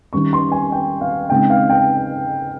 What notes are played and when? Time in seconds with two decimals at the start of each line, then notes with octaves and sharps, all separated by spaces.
0.13 D#3 G3 C#4 C#6
0.33 C6
0.52 G#5
0.72 G5
1.01 F5
1.30 C#3 G#3 C4 D#4 G5
1.50 F5
1.70 G5